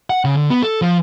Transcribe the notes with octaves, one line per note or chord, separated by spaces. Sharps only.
F#5
C#3
D3
B3
A4
F3